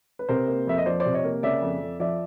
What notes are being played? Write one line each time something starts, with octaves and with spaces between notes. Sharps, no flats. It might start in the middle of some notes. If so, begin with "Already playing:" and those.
B4
C3 A#4 C5
A#3
F2 E5
D#5
F3 C5 D5
C5 D5
C3
C#5 D#5
A#3
C#3 D5 E5
F2
F2
F3 D5 E5